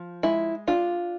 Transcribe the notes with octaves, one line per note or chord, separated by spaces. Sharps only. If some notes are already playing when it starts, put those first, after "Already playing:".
Already playing: F3
G#3 E4
D4 F4